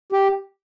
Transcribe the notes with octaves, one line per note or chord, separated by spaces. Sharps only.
G4